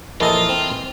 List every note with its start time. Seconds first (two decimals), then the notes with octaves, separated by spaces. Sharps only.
0.21 A#1 E3 F4 A4 A#4 D#5 D#6
0.49 C4